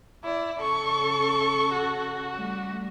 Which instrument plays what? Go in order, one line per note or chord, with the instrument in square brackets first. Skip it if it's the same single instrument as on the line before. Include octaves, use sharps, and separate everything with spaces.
[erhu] E4 [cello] D5
[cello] C#3 A4 [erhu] C#6
[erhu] F#4
[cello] G3 A3